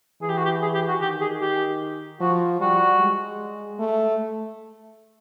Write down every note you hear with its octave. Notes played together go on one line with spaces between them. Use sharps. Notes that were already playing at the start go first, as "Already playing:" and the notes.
E3 G#4
G4
F#4
G4
G#4
G4
F#4
D#3 G4
G#4
G4
F3 F#4
G3 F#4
G#3
A3